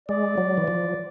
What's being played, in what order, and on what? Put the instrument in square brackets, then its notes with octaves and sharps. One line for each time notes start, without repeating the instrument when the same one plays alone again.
[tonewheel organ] G#3 [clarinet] D5
[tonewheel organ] F#3
E3
F3